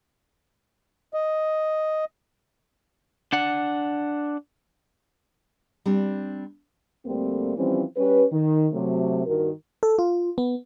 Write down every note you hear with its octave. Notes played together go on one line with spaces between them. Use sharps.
D#5
D4 F#5
G3 C4 D4
D2 G3 A3 A#3 C4
E3 F3 G3 C4 C#4
G3 C#4 G4 B4
D#3
C3 F#3 A3
G2 D#3 F#4 A#4
A4
F4
B3